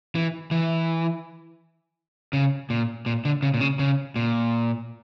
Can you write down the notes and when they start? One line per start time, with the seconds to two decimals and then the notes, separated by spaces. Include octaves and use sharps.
0.15 E3
0.51 E3
2.33 C#3
2.70 A#2
3.06 A#2
3.25 D3
3.43 C#3
3.54 A#2
3.61 C#3
3.79 C#3
4.16 A#2